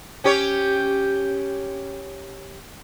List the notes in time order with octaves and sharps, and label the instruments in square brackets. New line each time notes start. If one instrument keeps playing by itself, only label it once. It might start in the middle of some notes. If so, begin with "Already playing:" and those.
[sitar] C#4 G4 C#5